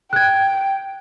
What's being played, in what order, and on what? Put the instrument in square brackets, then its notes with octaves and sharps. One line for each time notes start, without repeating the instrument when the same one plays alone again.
[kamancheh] G5 [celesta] F#6 G#6